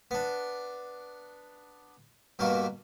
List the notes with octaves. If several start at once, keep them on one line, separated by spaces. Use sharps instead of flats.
B3 D4
G2 B2 A#3 F#4